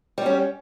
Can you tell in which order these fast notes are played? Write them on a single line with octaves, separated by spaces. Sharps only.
G3 F#4 C#4